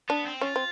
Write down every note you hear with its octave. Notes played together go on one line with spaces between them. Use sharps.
B3 D4
C4
C#4 F4
C4